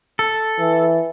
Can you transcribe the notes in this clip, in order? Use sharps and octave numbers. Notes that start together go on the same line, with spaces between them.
A4
E3